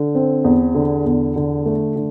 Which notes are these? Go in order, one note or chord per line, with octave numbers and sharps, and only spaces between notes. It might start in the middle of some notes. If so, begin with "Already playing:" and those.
Already playing: D3
C4
E2
D3
E2
D3
A3
D3